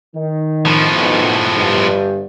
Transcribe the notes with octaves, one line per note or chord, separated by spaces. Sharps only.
D#3
A2 F3
B1
G1 G2